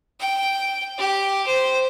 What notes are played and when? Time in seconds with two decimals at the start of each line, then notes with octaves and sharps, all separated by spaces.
0.20 G5
0.99 G4
1.47 C5